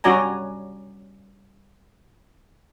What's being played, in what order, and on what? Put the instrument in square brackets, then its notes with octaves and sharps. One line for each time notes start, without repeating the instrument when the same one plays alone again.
[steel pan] G3 C#4 F#4 D5 G#5 A#5